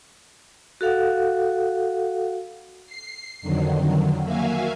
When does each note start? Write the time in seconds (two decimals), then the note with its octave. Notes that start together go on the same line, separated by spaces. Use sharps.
0.81 F#4 A4 F5 F#5
2.86 C7
3.42 F2 D3 D#3 F#3
4.23 A#3 F#4 E5 F5 G#5